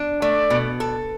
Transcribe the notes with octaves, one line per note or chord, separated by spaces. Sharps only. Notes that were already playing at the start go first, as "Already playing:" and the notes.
Already playing: D4
A3 D5
B2
A4